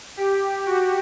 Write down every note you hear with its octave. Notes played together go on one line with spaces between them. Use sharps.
G4
F#4